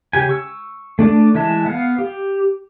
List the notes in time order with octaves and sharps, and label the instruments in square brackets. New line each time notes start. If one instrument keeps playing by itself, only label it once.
[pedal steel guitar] C#3 G4 G#5
C#6 E6
A3 D4 D5 D6
E3 G#3 E5 A5
B3 F5
G4